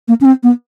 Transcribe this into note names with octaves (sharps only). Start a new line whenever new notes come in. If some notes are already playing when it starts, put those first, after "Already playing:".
A#3
C#4
C4
B3